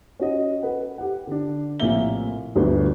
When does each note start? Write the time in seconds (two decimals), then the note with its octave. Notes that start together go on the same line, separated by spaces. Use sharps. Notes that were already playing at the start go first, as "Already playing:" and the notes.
0.20 C#4 F#4 D#5
0.63 A4 B4 F#5
0.98 G4 F#5
1.27 D3 D4
1.80 A#1 A2 C3 A#3 E5 G7
2.56 G1 D2 F#3 B3 D4 B4